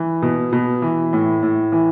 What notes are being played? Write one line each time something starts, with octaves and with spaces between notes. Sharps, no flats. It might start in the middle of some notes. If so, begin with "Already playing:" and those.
Already playing: E3
B2
B2
E3
A2
A2
E3